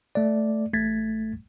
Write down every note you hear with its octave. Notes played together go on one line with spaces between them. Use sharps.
A3 D5
A1 A3 G#6 A6 B6